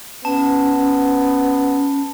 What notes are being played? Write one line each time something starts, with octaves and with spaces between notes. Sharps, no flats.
B3 C#4 A5